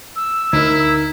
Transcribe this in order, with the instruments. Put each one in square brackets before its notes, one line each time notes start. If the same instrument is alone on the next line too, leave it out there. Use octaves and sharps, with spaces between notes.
[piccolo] E6
[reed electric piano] D2 [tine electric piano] D#4 A#4 [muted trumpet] E4